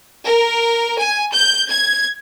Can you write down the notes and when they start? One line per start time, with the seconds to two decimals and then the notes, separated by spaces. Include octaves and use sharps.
0.25 A#4
0.99 G#5
1.32 G6
1.69 G#6